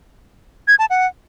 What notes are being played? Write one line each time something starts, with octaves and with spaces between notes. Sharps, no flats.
G#6
A5
F#5